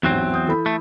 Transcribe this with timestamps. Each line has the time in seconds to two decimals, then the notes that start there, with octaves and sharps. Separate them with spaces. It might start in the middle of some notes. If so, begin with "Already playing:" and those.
0.03 A1 E2 G#2 F#3 C4
0.34 D#6 G6
0.47 E3 A4 B5
0.66 A3